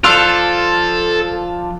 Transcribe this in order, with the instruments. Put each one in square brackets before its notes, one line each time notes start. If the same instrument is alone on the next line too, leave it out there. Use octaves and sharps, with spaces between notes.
[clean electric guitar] F3 D4 F4 [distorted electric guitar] A4 [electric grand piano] C6 E6 F#6